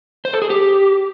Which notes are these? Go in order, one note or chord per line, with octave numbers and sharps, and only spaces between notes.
C5
A4
G#4
G4